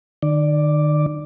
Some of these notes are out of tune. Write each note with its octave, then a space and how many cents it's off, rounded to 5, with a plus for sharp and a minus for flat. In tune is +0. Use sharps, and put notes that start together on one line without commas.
D#3 -45 D5 +0